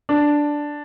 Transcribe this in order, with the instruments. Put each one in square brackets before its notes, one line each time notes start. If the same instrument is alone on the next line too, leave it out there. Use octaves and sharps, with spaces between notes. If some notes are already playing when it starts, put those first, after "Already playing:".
[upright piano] D4